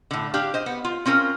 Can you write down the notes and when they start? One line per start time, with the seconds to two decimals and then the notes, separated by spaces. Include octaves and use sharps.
0.11 A2 D3
0.34 D4 G4 F5
0.54 C5 D#5
0.66 B3
0.85 F4
1.06 C4 C#4 F4 A#4